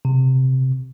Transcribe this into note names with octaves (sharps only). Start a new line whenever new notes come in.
C3